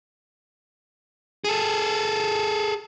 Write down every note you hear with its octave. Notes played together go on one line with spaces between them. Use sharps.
G#4 A4